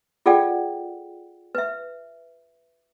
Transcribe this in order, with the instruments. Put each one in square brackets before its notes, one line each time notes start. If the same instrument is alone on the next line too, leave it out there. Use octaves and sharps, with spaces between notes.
[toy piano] F4 G#4 A4 D5 F#5 G5
B4 E5